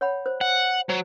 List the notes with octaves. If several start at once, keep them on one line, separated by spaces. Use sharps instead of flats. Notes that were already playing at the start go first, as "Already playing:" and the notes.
C#5 F#5 B5
C5
F#5
F#3 C5